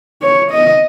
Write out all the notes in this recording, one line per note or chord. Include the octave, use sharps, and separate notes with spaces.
C#5
D#5